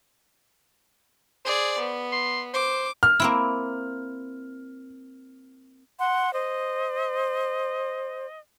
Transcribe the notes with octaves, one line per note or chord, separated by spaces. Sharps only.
G#4 C5 D5
B3
C6
C5 D6
F6
A#3 C4 E4
F#5 C6
C5 D#5